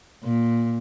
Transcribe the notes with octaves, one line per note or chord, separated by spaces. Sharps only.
A#2